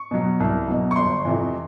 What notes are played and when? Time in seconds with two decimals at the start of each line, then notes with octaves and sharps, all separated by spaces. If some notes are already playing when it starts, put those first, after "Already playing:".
Already playing: C#6
0.11 B2 F#3
0.40 C2
0.68 B2 F#3
0.91 C#6
0.96 G1 C6
1.25 F2 C3 E3